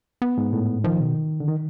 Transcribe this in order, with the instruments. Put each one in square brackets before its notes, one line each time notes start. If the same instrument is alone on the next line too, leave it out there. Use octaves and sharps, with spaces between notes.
[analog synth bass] B3
[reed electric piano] G#2
A2
[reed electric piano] D#3 [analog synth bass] F3
[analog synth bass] B2
[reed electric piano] D3
D#3